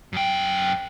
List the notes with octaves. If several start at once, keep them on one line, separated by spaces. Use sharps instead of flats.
F#2 G5